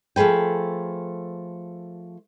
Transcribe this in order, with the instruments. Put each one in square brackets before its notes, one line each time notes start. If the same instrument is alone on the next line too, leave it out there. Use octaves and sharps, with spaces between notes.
[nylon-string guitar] F3 A3 G#4 B4 G5